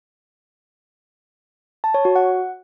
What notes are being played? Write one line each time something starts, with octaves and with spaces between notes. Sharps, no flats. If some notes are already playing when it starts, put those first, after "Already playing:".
A5
C#5
F#4
F#5